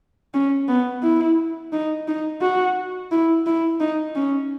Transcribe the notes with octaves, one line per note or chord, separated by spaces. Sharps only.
C#4
B3
E4
D#4
D#4
F#4
E4
E4
D#4
C#4